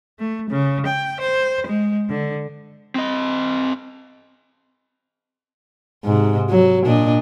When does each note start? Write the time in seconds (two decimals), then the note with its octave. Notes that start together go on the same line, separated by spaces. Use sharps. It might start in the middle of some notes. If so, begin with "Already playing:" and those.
0.19 A3
0.50 C#3
0.86 G5
1.21 C5
1.66 G#3
2.09 D3
2.95 C4 D#5
6.04 G#2 C3
6.49 F#3
6.86 A#2 D4 D#5